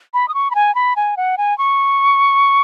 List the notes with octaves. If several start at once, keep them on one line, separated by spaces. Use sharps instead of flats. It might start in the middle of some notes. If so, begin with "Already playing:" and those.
B5
D#6
C#6
B5
G#5
B5
G#5
F#5
G#5
C#6